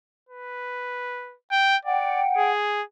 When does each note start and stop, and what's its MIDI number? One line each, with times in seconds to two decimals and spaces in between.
0.29 1.35 71
1.52 1.76 79
1.85 2.22 74
1.85 2.49 78
1.85 2.49 79
2.37 2.82 68